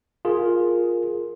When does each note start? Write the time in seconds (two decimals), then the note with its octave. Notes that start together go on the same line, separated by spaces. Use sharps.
0.25 F4 G#4 A#4